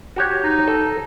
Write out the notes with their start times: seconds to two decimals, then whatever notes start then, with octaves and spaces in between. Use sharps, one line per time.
0.16 F#4 G4 C#5
0.44 D#4
0.68 A4